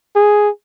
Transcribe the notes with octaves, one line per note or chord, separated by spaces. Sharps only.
G#4